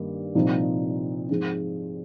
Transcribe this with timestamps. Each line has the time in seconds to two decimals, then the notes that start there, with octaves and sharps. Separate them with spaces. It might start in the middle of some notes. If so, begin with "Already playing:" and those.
Already playing: G2 D#3 A#3 D#4
0.35 C2 A#2 F3 C4 D#4
1.29 G#2 F3 G#3 C4